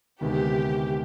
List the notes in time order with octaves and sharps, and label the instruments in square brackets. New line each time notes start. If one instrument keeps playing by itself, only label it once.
[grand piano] D2 C3 D#3 G#3 B3 [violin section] G4